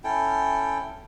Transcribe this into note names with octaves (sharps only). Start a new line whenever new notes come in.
C#4 E4 A4 G5